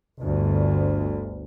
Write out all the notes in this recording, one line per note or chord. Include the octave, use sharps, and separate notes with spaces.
G1 D2